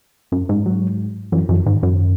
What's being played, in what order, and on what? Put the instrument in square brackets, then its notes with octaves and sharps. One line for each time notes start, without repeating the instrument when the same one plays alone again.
[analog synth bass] F#2
G#2
[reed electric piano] F#3
[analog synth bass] F#2 [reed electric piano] E3
[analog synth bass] F#2 [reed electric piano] E3
[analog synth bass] G#2 [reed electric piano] D#3
[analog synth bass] F#2